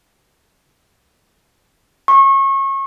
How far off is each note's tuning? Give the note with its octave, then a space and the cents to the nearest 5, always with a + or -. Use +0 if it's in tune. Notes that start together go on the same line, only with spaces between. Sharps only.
C#6 -30